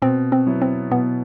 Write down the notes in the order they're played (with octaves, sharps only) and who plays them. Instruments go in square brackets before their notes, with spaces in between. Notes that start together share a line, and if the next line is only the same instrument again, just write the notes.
[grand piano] B2 [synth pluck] C4
[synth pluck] C4
[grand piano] F#3 B3 E4
[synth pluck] C4
[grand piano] B2 [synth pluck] B3